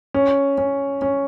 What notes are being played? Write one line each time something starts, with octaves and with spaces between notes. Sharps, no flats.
C#4
C#4
C#4